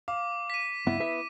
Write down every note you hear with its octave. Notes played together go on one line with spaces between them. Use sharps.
F5 D6
B6 D#7
C#2 G2 B3 E4
B3 E5